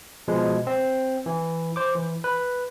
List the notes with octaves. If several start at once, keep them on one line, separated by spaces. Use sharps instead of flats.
B2 F3 G#3
C4
E3
C5 D6
E3
B4